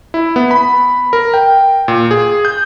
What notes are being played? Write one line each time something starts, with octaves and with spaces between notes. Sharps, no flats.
E4
B3
B5
A#4
G5
A#2
G#4
G6